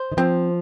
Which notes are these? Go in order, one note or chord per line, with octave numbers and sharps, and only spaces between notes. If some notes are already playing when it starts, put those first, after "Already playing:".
Already playing: C5
D#3
F3 C4